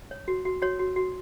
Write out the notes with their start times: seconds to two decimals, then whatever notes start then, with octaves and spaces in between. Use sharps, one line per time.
0.11 C#5
0.28 F#4
0.45 F#4
0.62 F#4 C#5
0.79 F#4
0.96 F#4